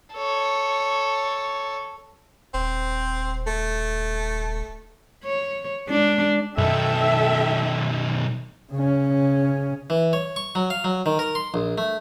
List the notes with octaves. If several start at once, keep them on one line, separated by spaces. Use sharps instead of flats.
A4 C#5
D#1 C4
A3
C#5
G#3 D4
B1 F#2 D#3 A4 E5 G5
C#3 C#4
E3
C#5
C#6
F#3
F5
F#3
D#3
A#4
C6
A#1
A3